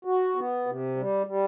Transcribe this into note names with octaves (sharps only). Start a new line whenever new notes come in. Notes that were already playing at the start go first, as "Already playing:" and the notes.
F#4
B3
C3
G3
G3